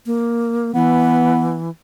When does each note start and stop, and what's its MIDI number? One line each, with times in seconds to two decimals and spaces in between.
0.06 0.74 58
0.75 1.70 52
0.75 1.59 59